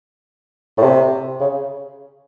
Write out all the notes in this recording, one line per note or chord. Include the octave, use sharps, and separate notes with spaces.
A2
C3
C#3